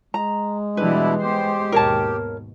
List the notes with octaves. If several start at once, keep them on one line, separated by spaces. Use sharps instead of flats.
G#3 A#5
B2 E3 G3 D4 E4 G4 B4
B3 G4 C5
D#2 G#2 B2 A#4 C#5 A5